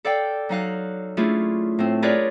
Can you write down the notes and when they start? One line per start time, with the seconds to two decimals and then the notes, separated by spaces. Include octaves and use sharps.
0.05 A4 D5 F5 G5
0.49 F#3 D#4 F5 F#6
1.17 A3 C#4 D4 E4 F4 G#4
1.79 A2 C4
2.02 F4 G#4 A#4 B4 C#5 D5